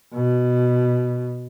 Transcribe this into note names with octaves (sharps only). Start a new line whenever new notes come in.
B2